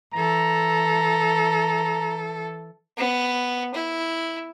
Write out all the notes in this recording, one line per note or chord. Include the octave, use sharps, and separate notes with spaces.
E3 A4 A#5
B3
E4